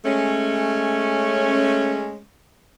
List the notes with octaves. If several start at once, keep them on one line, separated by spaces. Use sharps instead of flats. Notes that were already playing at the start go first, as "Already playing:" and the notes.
G#3 A3 C#4